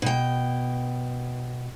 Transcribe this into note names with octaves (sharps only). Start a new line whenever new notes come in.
B2 G5